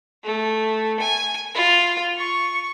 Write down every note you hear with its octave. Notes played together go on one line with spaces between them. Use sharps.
A3
G#5
F4
C#6